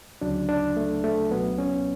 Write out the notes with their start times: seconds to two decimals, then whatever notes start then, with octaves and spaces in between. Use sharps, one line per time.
0.21 D2 C#3 F#3 D4
0.49 D4
0.77 A3
1.04 A3
1.31 C#2 B2 F#3 B3
1.58 C#4